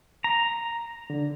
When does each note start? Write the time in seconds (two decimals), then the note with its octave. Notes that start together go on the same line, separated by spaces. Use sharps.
0.24 A#5
1.10 D3